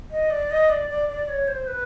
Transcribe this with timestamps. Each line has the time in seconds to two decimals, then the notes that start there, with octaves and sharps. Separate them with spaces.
0.11 D#5
0.30 D5
0.51 D#5
0.69 D5
0.90 D5
1.09 D5
1.29 C#5
1.48 C5
1.67 B4